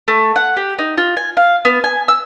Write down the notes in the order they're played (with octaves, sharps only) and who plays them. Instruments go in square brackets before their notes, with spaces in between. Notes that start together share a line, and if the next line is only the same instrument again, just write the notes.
[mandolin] A3
F#5
G4
D#4
F4
G#5
F5
B3
G#5
E6